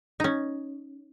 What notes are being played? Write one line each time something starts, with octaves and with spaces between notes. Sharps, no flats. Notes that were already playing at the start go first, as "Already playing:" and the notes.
C#4 D#4